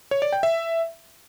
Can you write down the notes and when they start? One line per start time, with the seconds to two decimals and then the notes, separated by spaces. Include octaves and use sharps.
0.11 C#5
0.22 D5
0.33 G5
0.43 E5